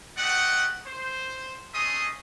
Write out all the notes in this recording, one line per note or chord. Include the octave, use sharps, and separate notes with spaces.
A3 G4 D#5 F#5
C5
A3 C#4 G#4 D#5 C6 D#6